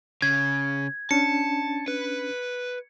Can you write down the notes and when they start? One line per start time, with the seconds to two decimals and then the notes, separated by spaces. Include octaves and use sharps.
0.22 C#3 G#6
1.11 C#4 D4 A5 C#7
1.88 B4